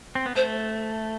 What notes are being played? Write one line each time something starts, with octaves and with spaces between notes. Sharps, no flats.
C4
B3
A3 C5